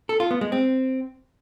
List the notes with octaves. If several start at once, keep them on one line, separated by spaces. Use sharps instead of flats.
A4
F4
B3
G#3
C4